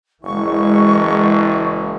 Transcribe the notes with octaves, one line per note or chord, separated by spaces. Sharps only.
F#1 E3 G#3 C#6